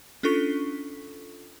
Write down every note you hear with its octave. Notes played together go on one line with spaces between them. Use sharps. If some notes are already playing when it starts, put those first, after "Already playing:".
C#4 D4 F4 A4 C#6 B6